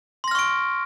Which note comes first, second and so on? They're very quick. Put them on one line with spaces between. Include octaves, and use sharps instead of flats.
C6 A#6 F6 C#6 D7